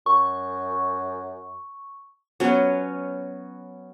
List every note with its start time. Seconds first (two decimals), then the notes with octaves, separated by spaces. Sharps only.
0.06 F#2 C#6
2.40 F#3 B3 C#4 C#5